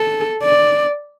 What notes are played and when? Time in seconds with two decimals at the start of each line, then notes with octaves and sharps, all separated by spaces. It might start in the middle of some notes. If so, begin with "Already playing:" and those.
Already playing: A4
0.43 D5